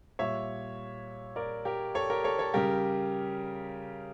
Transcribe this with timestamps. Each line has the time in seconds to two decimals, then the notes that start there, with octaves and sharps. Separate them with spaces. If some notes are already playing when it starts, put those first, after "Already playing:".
0.19 A#2 G3 C#5 E5
1.36 A#4 D5
1.65 G4 A#4
1.95 A4 C#5
2.10 G4 A#4
2.24 A4 C#5
2.39 A4 C#5
2.54 C#3 G3 G4 A#4